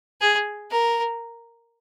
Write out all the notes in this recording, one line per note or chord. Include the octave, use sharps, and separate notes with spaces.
G#4
A#4